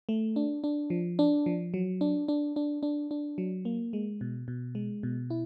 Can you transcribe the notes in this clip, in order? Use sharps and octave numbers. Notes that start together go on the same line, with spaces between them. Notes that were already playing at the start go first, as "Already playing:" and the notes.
A3
D4
D4
F3
D4
F3
F#3
D4
D4
D4
D4
D4
F#3
A#3
G#3
B2
B2
G#3
B2
E4